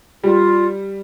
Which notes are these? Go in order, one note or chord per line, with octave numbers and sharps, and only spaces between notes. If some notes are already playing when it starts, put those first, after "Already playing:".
G3 F4